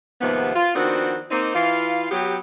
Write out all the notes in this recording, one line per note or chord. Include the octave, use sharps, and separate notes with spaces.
D#2 G#2 C3 F3 B3
F4
D#3 F3 B3 C4 D4 F#4
A#3 C4 D#4
E3 F4 F5
F#3 B3 G4